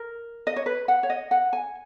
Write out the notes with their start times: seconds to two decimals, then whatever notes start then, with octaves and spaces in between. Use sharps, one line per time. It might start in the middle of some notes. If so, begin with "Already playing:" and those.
Already playing: A#4
0.47 D#5
0.56 C#5
0.66 B4
0.88 F#5
1.03 C#5
1.10 D#5
1.31 F#5
1.53 G#5